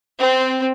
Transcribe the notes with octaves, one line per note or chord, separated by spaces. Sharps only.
C4